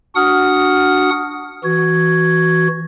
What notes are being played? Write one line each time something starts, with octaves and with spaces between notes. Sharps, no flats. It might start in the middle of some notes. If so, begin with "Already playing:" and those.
D4 F#4 F#5 D#6 F6
E3 F#4 G#6